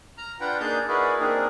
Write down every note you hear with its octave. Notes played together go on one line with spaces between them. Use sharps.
A#5 F6
D4 F4 B4 F#5 G5 A#5
A#3 D4 D#4 G#4 A5 G6
E4 F#4 G#4 A#4 B4 D5
A#3 C4 D4 D#4 G#4 A#4